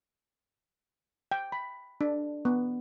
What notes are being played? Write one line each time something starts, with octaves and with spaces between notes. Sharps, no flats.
G5
B5
D4
B3